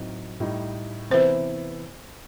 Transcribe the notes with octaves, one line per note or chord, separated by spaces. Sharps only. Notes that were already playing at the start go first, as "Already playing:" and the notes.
Already playing: A2 F#3 C4 D#4
A2 G3 D#4
C3 E3 B3 E4 C5